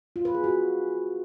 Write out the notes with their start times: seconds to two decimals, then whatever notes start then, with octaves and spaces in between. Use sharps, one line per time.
0.16 F4
0.25 B4
0.34 G#4
0.44 F#4